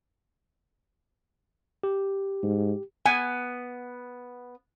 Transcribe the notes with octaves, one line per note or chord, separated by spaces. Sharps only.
G4
G#2
B3 G#5